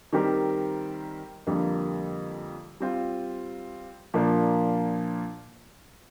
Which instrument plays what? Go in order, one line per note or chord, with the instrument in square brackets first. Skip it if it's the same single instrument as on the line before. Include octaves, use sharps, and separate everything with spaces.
[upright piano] D#3 G3 C4 G4 A#4
F2 D3 G3 A#3
G3 C4 F4
A#2 F3 A#3 D4